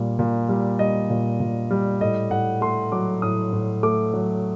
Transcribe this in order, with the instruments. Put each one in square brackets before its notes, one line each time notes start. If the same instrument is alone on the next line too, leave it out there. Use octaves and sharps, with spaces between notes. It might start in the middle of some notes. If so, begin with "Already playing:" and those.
Already playing: [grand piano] A#2 G3
A#2
G3
G3 D#5
A#2
A#2
G3
A2 D#5
A2 F#5
A3 C6
F#3 D6
A2 D#6
A2
A3 D6
F#3